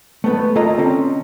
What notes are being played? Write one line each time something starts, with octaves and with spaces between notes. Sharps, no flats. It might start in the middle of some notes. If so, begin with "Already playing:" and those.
A3 B3 B4
C#2 A#3 F4 A4 D#5 A#5
D3 C4 C#4